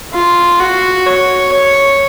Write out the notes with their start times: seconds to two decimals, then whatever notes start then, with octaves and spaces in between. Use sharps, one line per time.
0.14 F4
0.60 F#4
1.06 C#5
1.53 C#5